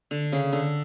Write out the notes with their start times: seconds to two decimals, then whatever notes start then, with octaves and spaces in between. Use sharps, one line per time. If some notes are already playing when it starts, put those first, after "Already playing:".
0.11 D3
0.32 C#3
0.53 D3